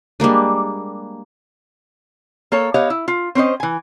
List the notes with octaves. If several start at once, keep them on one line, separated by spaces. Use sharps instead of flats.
G3 G#3 A#3 D4
A#3 A4 C#5
B3 G4 C#5 D#5 F5
E4
F4
C4 C#4 C5 D#5
E3 G#5